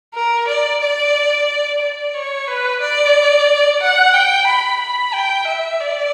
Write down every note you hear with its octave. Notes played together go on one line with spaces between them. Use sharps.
A#4
D5
D5
D5
C#5
B4
D5
F#5
G5
B5
B5
G5
E5
D5